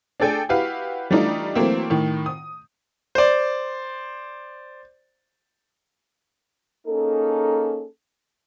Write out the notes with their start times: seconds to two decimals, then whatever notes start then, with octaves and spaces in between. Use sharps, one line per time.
0.20 D4 G#4 A4 G5 G#5
0.49 E4 F#4 G4 B4 F5
1.10 E3 G3 A3 D4 D#4 F4
1.55 E3 F#3 A3 A#3 C4
1.90 A2 D#3
2.26 D#6
3.15 C5 D5
6.87 A#3 C#4 D#4 G#4 A4